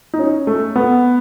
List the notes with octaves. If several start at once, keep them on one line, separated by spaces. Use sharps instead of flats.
D#4
C#4
A3
B3